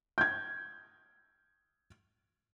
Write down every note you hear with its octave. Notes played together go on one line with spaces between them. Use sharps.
G6 G#6